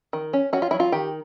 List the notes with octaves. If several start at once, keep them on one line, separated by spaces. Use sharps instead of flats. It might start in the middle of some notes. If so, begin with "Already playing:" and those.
D#3
C#4
C#4 F#4
F4
F#3 E4
F4
D#3 G4